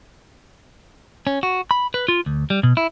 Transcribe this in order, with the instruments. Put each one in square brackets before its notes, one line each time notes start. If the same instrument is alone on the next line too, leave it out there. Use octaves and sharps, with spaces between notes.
[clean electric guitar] C#4
F#4
B5
B4
F4
D2
G3
B2
E4